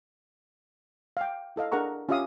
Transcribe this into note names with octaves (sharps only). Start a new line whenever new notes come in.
F5 G5
E4 A4 D#5 F5
D4 G#4 A#4 F#5 A#5 C#6
C#4 F4 G4 E5 F5 D#6